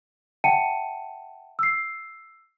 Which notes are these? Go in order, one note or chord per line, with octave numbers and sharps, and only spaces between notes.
E5 F#5 G5 A5 C#7 D#7
E6 C7